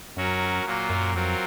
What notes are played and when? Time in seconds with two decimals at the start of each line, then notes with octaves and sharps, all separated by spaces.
0.16 F#2 F#3 C#4 F#4 A#4
0.65 A#2 F#3 A#3 F4 A#4
0.90 F#2
1.13 F2 F#3 C4 F4 A#4